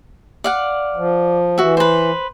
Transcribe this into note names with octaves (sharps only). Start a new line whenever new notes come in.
D5 F5 F#5
F3
E3 F#4 E5
B4 C5